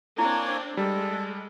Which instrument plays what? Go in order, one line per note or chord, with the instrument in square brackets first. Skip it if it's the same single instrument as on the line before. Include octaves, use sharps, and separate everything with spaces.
[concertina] A#3 C#5 G#5 [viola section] C4 D4 [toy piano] E4
[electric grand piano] G3 [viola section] G#3 [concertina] A4